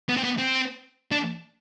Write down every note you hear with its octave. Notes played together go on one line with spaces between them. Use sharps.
B3
C4
B3
C4
D4